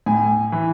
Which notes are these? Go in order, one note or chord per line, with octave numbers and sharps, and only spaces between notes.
A2 G#5
E3